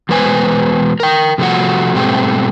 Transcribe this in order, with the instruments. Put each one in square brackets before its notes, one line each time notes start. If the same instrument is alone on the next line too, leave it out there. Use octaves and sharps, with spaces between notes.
[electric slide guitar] E2 B2 G#3 B4 C5 G#5
A#4 G5
C3 F3 A3 F#4 F#5
G#2 B2 G3 A3 C4 G4